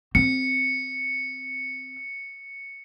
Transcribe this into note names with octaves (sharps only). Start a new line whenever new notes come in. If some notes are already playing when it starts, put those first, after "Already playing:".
C4 C#7